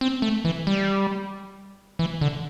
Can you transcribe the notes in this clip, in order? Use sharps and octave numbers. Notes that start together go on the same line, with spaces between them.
C4
A3
E3
G3
E3
D3